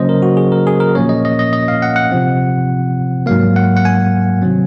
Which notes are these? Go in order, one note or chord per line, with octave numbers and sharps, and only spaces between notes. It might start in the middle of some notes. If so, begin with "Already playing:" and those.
Already playing: C#3 F#3 A#3 C#4 C5 D#5
A#4
F#4
G#4
A#4
G#4
A#4
A#2 F3 A#3 C#4 C#5
D#5
D#5
D#5
D#5
F5
F#5
F#5
C3 F3 C4
G#2 F#3 A#3 F5
F#5
F#5
G#5
C3 D#3 F#3 C4